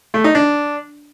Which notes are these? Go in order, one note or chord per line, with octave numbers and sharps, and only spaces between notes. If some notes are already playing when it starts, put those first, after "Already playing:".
A3
D#4
D4